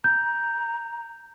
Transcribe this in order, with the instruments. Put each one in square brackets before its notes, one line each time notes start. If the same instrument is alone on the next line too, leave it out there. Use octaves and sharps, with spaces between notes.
[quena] A#5 [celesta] G6